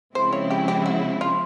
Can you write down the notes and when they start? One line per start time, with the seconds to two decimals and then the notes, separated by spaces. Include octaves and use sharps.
0.15 C#3 F3 G#3 C4 E4 C5
0.33 C#5
0.51 G4
0.68 G4
0.86 F#4
1.21 F4